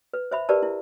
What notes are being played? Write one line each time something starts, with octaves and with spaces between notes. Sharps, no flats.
B4
C5 E5 B5
G4 A#4 B4 D5 A5
E4